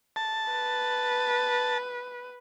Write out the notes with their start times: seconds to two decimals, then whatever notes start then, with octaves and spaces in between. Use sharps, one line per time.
0.16 A5
0.51 B4